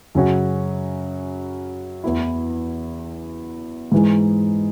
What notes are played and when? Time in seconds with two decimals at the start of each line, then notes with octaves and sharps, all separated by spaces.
0.15 F#2 C#3 F#3 C#4 F#4
2.04 E2 E3 B3 E4
3.92 G#2 E3 G#3